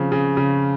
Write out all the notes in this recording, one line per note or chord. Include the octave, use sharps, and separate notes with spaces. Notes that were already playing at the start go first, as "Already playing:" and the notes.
Already playing: C#3 F3 C4
C#3
C#3